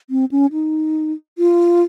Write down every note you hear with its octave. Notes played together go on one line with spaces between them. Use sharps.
C4
C#4
D#4
F4